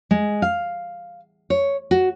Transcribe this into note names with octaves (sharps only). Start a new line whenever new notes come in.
G#3
F5
C#5
F#4